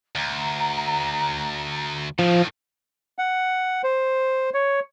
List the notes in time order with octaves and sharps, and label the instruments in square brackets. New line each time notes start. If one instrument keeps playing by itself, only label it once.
[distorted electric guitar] D2 [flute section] A#5
[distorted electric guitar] A2 D#3 [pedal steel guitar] F3
[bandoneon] F#5
C5
C#5